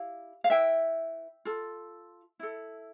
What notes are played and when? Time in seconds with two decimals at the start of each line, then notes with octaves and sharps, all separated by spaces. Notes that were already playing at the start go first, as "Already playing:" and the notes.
Already playing: E4 G4 F5
0.44 F5
0.50 E4 B4 E5 G5
1.45 F4 A4
2.39 E4 A4